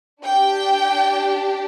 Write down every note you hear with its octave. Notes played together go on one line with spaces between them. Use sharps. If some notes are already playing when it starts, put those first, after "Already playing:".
D4 G4 G5